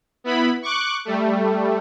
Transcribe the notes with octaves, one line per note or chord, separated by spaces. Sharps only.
B3 E4 B5
C#6 D6 F#6
G3 A3